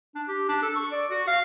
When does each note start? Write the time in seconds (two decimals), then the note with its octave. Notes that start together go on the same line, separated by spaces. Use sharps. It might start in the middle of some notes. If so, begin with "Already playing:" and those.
0.15 D4
0.28 G4
0.49 D4
0.63 A4
0.76 C#6
0.92 D5
1.10 F#4
1.27 F5